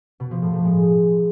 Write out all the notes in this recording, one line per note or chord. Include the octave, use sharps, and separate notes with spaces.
B2
F3
A2
A2
G#3